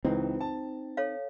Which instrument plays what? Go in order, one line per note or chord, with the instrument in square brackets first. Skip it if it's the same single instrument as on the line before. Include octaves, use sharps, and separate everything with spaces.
[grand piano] C#2 E3 B4 [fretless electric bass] C4 [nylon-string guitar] D#4
[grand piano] A5
[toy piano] A4 C#5 F5